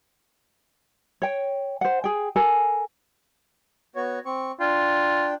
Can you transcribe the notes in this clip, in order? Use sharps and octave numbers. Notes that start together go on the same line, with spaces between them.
C#5 G5
C5 F#5
G#4 G5
A4 A#4 G#5
B3 F#4 C#5
C4 C#6
D4 F4 G5